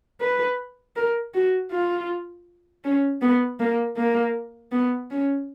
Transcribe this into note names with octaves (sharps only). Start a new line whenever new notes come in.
B4
A#4
F#4
F4
C#4
B3
A#3
A#3
B3
C#4